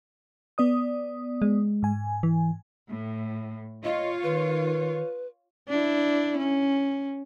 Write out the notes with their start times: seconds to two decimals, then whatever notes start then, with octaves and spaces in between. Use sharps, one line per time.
0.58 B3 D5 D#6
1.42 G#3
1.83 G#2 G#5
2.23 E3
2.90 A2
3.85 F4 C#5 D#5
4.23 D#3 B4
5.69 D4 E4
6.38 C#4